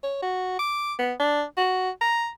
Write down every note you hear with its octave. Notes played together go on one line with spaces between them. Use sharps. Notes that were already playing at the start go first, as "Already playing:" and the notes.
C#5
F#4
D6
B3
D4
F#4
A#5